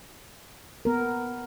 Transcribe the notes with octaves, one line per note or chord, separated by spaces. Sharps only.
B3 A#4